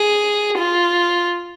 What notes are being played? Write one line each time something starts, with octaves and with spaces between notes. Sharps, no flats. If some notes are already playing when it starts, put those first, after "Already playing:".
Already playing: G#4
F4